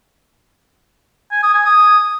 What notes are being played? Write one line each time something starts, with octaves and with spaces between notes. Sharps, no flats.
G#5
D#6
G#5
D#6